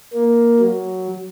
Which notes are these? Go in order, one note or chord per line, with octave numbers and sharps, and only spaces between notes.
A#3
F#3